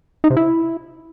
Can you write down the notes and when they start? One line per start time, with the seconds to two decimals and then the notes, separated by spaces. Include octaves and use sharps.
0.24 D#4
0.30 C3
0.37 E4